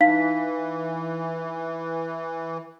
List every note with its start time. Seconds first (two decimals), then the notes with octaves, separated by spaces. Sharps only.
0.01 E3 D#4 F5 B6